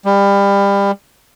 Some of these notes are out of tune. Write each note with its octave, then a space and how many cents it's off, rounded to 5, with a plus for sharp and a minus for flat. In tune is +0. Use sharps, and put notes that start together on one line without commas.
G3 +30